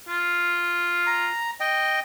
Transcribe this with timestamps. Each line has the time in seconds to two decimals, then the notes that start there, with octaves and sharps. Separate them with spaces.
0.08 F4
1.07 A#5
1.60 D#5 G5